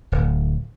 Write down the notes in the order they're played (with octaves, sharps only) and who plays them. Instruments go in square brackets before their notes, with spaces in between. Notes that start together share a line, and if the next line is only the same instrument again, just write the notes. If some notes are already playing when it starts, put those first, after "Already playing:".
[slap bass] D1